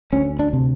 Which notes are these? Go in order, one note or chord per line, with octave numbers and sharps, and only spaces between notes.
D2 C#4
D4
C3